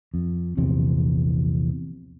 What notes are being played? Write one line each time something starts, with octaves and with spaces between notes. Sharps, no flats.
F2
A#1 E2 C3